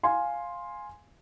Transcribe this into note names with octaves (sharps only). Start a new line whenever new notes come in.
F5 G#5 C6